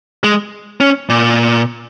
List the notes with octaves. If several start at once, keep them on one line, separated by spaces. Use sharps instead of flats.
G#3
C#4
A#2